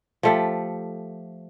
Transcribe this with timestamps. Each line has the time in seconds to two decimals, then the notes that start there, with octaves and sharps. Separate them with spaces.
0.23 F3 A3 G4